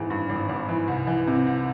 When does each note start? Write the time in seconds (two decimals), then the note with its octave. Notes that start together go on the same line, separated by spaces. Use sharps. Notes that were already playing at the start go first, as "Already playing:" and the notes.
Already playing: G#1 E3 G#4
0.10 G2
0.29 G#1
0.49 G#1
0.69 E3
0.88 C2
1.07 E3
1.27 C3
1.47 C2